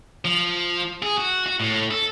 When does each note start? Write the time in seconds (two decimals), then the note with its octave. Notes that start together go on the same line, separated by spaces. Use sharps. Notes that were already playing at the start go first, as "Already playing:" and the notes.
0.25 F3
1.03 G#4
1.18 F#4
1.46 F#4
1.60 A2
1.91 A4